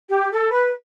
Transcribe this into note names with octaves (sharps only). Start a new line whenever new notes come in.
G4
A4
B4